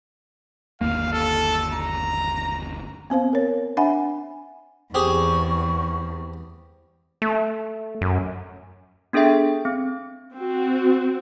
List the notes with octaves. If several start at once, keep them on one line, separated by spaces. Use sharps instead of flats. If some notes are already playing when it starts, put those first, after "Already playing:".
G1 D#2 A#3 F5
A4
A#5
B3 C4 C5 F5
A#4 C#5
D4 E5 F#5 G#5 B5
E2 C4 G4 G#4 C#6
A3
F#2
B3 D4 G#4 A4 E5 G5
C4
C4 F#4